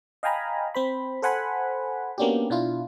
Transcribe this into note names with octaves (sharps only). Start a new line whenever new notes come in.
D#5 F5 G5 G#5 A#5 B5
C4 C5 B5
A4 C5 F#5 G#5 B5
A#3 B3 C#4 D4 F#4 G4
B2 D4 E4 F4